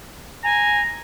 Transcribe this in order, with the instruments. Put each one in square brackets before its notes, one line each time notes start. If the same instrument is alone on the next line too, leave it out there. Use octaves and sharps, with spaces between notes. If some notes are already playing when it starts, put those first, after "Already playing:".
[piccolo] G#5 [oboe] A#5